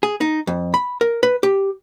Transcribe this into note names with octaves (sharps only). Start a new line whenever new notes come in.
G#4
D#4
F2
B5
A#4
B4
G4